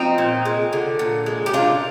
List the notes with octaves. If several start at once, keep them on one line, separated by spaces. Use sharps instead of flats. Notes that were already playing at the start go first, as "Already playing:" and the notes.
Already playing: F3 C4 D#4
A#2
G#3
D3
A#2
G#3
G4
A#2 D4 F4